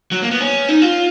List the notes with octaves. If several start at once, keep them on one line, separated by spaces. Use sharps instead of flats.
F#3
A#3
B3
C#4
D#4
F4